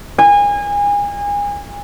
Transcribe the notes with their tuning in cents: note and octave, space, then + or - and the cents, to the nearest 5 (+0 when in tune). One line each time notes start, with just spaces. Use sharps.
G#5 -30